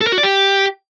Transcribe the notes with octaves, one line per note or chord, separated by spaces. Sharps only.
A4
A#4
F#4
D5
G4